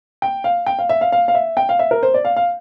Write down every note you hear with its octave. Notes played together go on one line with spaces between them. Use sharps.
G5
F5
G5
F5
E5
F5
F5
F5
E5
G5
F5
E5
A#4
C5
D5
F5
F5